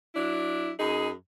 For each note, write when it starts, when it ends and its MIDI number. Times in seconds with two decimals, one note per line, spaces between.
0.15 0.71 54
0.15 0.71 62
0.15 0.71 64
0.78 1.09 42
0.78 1.09 63
0.78 1.09 68